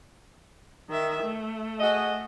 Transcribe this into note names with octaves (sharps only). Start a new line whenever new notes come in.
D#3 E5
A3
F#4 G#4 D#5